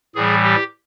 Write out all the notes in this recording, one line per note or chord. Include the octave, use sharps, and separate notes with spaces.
A2 E3 G3 G#4
G4